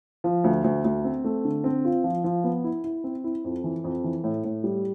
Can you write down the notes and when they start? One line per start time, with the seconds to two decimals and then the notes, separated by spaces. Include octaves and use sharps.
0.24 F3
0.44 D2
0.64 D2
0.84 D2
1.04 C4
1.24 A3
1.45 D3
1.64 C4
1.85 F4
2.04 F3
2.24 F3
2.44 B3
2.64 E4
2.84 E4
3.04 C4
3.24 E4
3.44 F2
3.64 E3
3.84 F2
4.04 E3
4.24 A2
4.44 A2
4.64 G3